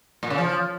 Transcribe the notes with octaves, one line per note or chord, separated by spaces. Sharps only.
A#2
C#3
F3